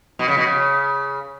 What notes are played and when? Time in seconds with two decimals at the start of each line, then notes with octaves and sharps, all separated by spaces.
0.19 B2
0.28 C#3
0.37 B2
0.46 C#3